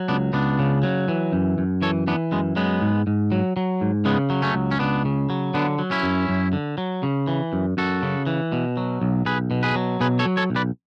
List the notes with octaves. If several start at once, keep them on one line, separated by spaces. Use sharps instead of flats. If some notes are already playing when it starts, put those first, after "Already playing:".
Already playing: F#3
C#2 B3 D4
C#2 B3 D4
C#3
F#3
E3
F#2
F#2
E3 A4 C#5
E3 B3 D4
F#2 G#3 B3
F#3 G#3 B3
G#2
G#2
F#3
F#3
G#2
C#3 G#3 B3
F#3
A3 C#4
C#2
C#4
C#2 B3 D4
C#3
F#3
D3 B3 D4
F#3
C#4 E4
F#2
F#2
D3
F#3
C#3
E3
F#2
F#2 F#4 A4
C#3
E3
B2
F#3
B1
B1 G#4 B4
B2
G#4 B4
F#3
B2 G#4 B4
A4 C#5
F#3
A4 C#5
B1
B4 D5